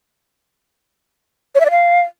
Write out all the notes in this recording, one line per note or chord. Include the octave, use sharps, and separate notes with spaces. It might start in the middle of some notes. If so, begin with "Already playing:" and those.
C#5
E5
D5
F5